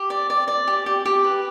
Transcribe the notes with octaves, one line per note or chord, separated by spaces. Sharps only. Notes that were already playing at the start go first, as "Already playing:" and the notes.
Already playing: G4
D5
D5
D5
G4
G4
G4
B4